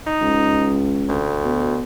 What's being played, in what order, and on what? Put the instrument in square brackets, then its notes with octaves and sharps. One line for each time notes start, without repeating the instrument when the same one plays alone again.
[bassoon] D#4
[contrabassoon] C#2
[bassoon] D2
[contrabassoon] B2